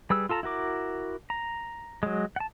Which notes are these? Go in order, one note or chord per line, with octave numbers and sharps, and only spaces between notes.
G3 G#4 B4 E6
F4 A4 A5 A#5
E4 F#4 A#4 D6
A#5
F#3 G#3
F#5 A5